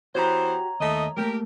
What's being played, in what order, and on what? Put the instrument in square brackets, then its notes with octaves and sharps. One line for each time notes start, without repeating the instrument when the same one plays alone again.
[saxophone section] E3 B3 C5 [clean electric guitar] F#4 G4 [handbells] C#5 A#5
[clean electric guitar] D#2 [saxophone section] A3 D#5
[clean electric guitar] G3 A3 A#3 [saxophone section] G4 A#4